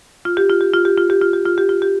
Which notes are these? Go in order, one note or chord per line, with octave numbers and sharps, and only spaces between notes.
F4
G4
F4
G4
F4
G4
F4
G4
F4
G4
F4
G4
F4
G4